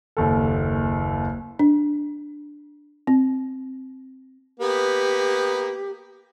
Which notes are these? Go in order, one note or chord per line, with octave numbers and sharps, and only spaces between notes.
F#1 D#2 A4
D4
C4
A#3 B3 G4